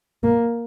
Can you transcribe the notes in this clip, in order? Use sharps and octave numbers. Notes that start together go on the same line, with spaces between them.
A#3